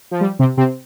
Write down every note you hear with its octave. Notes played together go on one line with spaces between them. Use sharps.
F3
G3
C3 C4
C3 C4